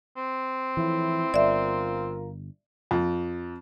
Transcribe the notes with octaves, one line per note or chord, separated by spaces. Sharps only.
C4
A2 E3 F3 E4
G1 F4 A#4 D5 E5
F2